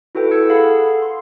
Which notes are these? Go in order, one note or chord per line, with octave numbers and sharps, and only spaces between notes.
E4 F#4 A4 B4 G5
E6 G#6 C#7
G#4 A4 F5 F#5 B5
C6